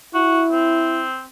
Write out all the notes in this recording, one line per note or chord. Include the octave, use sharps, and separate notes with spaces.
E4 F#4
C4